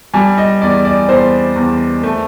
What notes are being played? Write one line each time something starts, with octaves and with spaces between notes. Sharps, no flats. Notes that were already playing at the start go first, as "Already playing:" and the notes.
G3 G#5
D#5
E2 D5
D5
E2 C5
E2
A3